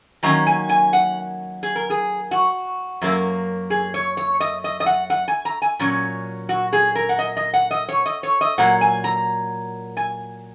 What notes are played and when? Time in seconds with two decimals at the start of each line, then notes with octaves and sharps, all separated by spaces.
0.23 D#3 F#3 A#3 C#4 A#5
0.46 G#5
0.69 G#5
0.93 F#5
1.63 G#4
1.75 A#4
1.90 G#4
2.31 F#4
3.01 F#2 F#3 A#3
3.70 G#4
3.94 C#5
4.17 C#5
4.40 D#5
4.64 D#5
4.80 D#5
4.86 F#5
5.10 F#5
5.28 G#5
5.45 A#5
5.62 G#5
5.79 A#2 F#3 C#4
6.49 F#4
6.73 G#4
6.95 A#4
7.09 F#5
7.19 D#5
7.37 D#5
7.53 F#5
7.71 D#5
7.89 C#5
8.06 D#5
8.23 C#5
8.41 D#5
8.58 A#2 F#3 A#3 F#5
8.81 G#5
9.04 A#5
9.97 G#5